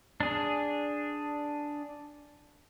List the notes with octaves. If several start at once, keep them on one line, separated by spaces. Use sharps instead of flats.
D4 G#4